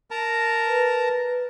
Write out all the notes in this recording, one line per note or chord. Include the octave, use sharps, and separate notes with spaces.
A#4 A5 A#5
B4